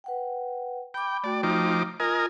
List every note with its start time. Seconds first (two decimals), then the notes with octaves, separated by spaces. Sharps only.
0.04 B4 F#5 G5
0.94 G5 B5 D6
1.24 A3 F#4 D5 G5
1.43 F3 D#4 D6
2.00 F4 A#4 D#5 G#5